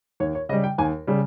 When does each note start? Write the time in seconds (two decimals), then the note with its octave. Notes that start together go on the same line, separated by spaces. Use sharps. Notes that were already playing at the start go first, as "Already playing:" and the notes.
0.20 D#2 C#5
0.35 C#5
0.49 C#3 D#5
0.53 G3
0.64 G5
0.78 D#2 G#5
1.07 C#3 G3